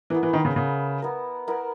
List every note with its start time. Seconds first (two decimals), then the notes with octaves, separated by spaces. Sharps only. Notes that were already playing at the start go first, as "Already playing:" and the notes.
0.10 E3 B3 E4 A#4
0.23 E3
0.33 D#3
0.45 C#3
0.56 C#3 B3 E4 A#4
1.02 B3 E4 A#4
1.48 B3 E4 A#4